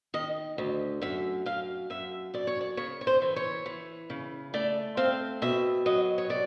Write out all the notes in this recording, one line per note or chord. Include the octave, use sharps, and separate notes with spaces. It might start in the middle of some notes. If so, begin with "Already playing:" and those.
D#3 D#5
D2
F#2 E5
F#2 F5
F#2 E5
F#2 D5
C#5
D5
C#3 C#5
C#5
C5
E3
C#5
E3
C#3
A3 D5
C4 F5
B2 E5
F#3 D#5
C#5
C3 D5